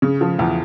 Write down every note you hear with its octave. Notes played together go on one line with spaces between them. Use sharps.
C#3
F3
E2